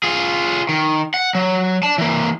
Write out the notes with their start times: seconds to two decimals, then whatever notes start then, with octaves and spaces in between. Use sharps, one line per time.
0.03 F4 G#4
0.69 D#3
1.14 F#5
1.35 F#3
1.83 D5 A5
1.98 E3 A#3